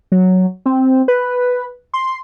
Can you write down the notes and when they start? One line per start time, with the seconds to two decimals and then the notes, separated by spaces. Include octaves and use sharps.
0.12 F#3
0.66 C4
1.08 B4
1.94 C6